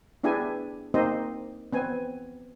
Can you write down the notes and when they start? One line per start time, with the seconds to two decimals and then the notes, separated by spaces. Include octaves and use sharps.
0.24 B3 D4 E4 G4 G#4 G#5
0.94 A#3 C4 D#4 G4 C5 D#5
1.73 B3 C4 G#5